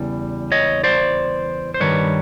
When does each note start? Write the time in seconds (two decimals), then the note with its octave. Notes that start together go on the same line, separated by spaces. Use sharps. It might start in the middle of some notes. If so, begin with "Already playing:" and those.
Already playing: E2 C#3 E3 G3
0.52 C#5 D#5
0.84 C5 D5
1.74 C5
1.80 G2 D#3 G3 B4 C#5